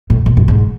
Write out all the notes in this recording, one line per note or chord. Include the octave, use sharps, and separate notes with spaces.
A2
A2
F#2
G#2